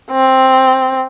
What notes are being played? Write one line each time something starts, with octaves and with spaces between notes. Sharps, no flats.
C4